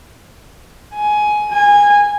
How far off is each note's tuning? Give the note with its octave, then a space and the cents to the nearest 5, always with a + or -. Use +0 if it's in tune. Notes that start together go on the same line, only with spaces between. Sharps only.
G#5 +15
G#5 -20